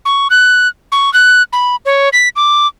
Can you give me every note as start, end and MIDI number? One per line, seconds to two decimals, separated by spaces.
0.05 0.28 85
0.30 0.68 90
0.92 1.12 85
1.14 1.42 90
1.53 1.76 83
1.85 2.09 73
2.13 2.29 95
2.36 2.67 86